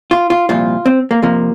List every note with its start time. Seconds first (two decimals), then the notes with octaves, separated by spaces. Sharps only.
0.11 F4
0.30 F4
0.49 C2 A#2 F3 F4
0.86 C4
1.11 A#3
1.22 F2 C3 F3 A#3